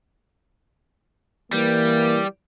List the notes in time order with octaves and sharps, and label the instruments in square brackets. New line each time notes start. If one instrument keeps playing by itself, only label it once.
[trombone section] E3 A#3 [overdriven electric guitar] G3